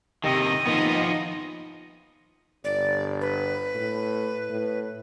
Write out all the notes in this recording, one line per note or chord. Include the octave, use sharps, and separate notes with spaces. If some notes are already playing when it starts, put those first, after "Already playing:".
C3 D#3 G4 D#5 E6 C#7
D#3 F3 A#3 B3 D#4
G1 D5
B4
A2
A2